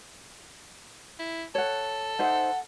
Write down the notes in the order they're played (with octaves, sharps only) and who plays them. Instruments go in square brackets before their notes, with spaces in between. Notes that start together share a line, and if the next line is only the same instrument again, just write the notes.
[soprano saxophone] E4
[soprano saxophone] A4 [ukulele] C#5 F#5
[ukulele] D#4 C5 E5 [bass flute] F#5